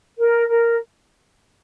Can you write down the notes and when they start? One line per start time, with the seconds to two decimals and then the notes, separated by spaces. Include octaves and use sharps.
0.18 A#4
0.49 A#4